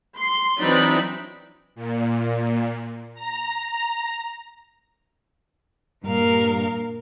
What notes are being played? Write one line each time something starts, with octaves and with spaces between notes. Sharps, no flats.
C6
E3 F#3 C4 D4 D#4 B5
A#2
A#5
G2 A#2 A#4 F5